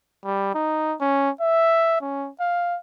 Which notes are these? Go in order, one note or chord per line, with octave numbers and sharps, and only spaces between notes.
G3
D#4
C#4
E5
C#4
F5